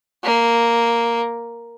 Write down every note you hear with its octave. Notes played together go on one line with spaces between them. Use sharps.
A#3